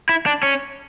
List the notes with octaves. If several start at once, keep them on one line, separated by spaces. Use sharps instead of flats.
E4
D4
C#4